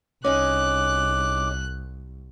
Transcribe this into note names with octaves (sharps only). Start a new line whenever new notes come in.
C2 C#4 D#4 G#4 D6 F#6